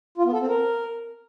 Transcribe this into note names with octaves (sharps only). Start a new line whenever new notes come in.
F4
B3
A4
C4
A#4